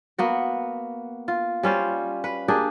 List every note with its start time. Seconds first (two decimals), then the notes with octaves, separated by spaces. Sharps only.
0.18 A#3 B3 F#4
1.28 F4
1.63 G3 C#4 F4 C5
2.24 B4
2.48 A#3 D4 G4 G#4